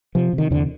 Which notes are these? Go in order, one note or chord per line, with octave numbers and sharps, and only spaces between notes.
C3 F3
C3
D#3
E2 D3